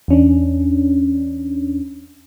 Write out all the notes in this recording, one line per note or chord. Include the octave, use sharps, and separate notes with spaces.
E2 C#4 D4